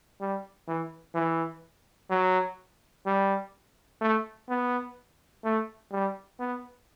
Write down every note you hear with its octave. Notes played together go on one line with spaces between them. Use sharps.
G3
E3
E3
F#3
G3
A3
B3
A3
G3
B3